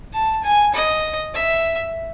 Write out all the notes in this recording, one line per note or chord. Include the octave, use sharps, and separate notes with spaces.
A5
G#5
D#5
E5